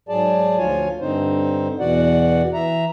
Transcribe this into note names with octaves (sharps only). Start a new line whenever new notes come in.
G#2 F#3 G#4 D5 A5
D2 F3 F4 C#5 G#5
G2 D3 C4 D#4 C5
E2 B2 E3 F#4 D5 F#5
E3 E5 A#5